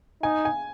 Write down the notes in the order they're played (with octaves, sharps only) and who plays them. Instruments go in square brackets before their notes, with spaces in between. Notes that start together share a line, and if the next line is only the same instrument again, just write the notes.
[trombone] D#4 [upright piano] G#5
[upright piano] G#5